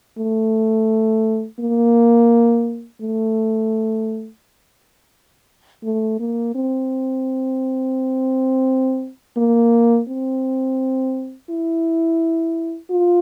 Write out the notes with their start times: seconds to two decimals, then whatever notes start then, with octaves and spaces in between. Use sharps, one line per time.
0.18 A3
1.60 A#3
3.02 A3
5.83 A3
6.19 A#3
6.55 C4
9.37 A#3
10.08 C4
11.50 E4
12.91 F4